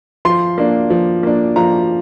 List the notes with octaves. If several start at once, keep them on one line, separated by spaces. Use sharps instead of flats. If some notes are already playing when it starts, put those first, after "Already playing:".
F3 C6
A#3 D4
F3
A#3 D4
F3 A#5